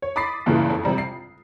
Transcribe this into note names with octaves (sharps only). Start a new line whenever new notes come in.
C#5
B5 D6 D#6 A6 B6 C7
G2 A#2 C#3 E3 A3
F2
A#1 C3 G3 A#5
C7